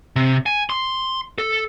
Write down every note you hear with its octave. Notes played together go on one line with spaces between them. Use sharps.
C3
G#5
C6
A4